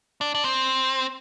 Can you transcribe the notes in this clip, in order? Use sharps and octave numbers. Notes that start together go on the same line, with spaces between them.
D4
D4
C4